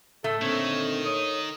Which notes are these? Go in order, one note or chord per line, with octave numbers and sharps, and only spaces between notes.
A2 A3 A4
A#2 D3 D#3 C4 C#5
C#5 D#6